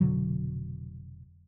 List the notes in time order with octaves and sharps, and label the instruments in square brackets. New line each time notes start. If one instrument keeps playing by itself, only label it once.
[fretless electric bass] F1 B2 D3 F#3